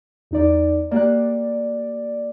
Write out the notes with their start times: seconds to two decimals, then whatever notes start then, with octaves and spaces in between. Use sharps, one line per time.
0.31 E2 D#4 D5
0.91 A#3 G4 D5 F#6